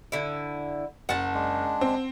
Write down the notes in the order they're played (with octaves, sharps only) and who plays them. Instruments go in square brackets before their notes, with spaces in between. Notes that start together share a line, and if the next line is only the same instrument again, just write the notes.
[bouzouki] D3 E4
[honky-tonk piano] F#1 [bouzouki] F#5 A5
[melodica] G#3 D4
[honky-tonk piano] C4